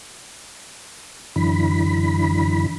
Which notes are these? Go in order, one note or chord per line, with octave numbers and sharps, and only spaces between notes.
F#2 D3 E3 B5